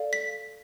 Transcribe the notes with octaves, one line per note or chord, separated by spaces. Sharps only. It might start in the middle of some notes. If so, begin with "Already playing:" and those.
Already playing: A4 D5 F5
B6